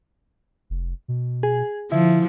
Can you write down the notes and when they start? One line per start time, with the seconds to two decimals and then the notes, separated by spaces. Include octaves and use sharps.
0.70 F1
1.08 B2
1.43 G#4
1.92 D3 F3 E4